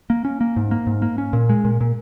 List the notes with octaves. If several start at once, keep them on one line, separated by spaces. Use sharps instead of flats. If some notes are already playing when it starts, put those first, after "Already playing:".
A#3
C#4
A#3
G#2
A#3
G#2
A#3
C#4
A#2
G#3
A#2
A#2